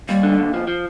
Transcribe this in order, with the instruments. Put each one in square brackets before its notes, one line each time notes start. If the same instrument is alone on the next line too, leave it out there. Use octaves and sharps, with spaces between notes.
[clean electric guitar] D#2 [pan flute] G3
[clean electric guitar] D3
D#2
F3
F3